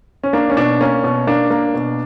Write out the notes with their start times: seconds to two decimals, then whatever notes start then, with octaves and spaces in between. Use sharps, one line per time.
0.24 C#4
0.33 A#3 D4
0.50 C#4
0.57 B2 D4
0.80 A#3 C#4
1.04 B2
1.27 A#3 D4
1.50 A#3
1.74 B2